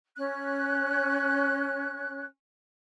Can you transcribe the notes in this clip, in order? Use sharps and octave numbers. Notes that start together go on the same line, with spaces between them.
C#4 F#6